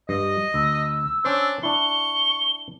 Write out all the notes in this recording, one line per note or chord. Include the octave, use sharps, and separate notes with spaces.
G2 D#5
D2 E6
C#4 D4 C5
D4 E4 C#6 G7